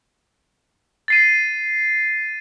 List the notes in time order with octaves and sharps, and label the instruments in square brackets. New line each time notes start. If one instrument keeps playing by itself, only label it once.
[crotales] A6 C7 D#7